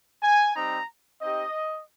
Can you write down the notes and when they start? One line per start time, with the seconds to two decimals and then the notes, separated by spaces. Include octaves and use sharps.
0.22 G#5
0.55 G3 C4 D#4 A#5
1.21 C4 D#4 G4 D#5